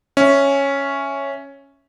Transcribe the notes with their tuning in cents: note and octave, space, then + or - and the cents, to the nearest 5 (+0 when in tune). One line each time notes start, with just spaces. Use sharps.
C#4 +0 E5 +0